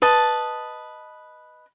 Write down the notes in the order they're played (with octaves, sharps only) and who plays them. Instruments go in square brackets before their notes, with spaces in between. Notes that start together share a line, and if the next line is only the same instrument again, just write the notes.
[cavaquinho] B4 D#5 A5